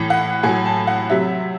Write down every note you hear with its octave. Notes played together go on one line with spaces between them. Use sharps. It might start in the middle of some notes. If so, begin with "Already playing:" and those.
Already playing: A2 E3
F#5
A2 F#3 G#5
A5
F#5
C3 F#3 E5